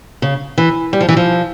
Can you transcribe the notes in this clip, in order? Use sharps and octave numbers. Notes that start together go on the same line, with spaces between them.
C#3
E3
G3
F3
E3
F3